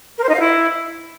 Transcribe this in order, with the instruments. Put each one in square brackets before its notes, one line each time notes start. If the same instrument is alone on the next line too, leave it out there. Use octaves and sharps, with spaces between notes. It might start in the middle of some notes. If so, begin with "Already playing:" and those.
[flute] A#4
C5
D#4
F5
E4